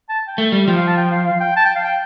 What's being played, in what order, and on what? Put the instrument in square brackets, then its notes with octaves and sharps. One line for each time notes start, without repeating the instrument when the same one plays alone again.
[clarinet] A5
G5
[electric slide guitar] A3
G3
[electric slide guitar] F3 [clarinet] G5
[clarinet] F5
A5
G5
F5
F5
G5
A5
G5
F5
G5